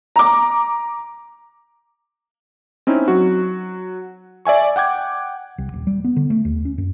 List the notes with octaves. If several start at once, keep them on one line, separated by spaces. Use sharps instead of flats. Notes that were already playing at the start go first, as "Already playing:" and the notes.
A#5 D6
C4 C#4 D#4 E4
F#3 F#4
D5 E5 G#5 C#6
F#5 G5 D6 G#6
C2
D#1
G3
B3
D3
A3
D#2
C#4
F#2